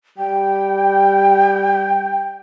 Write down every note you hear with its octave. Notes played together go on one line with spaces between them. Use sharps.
G3 G5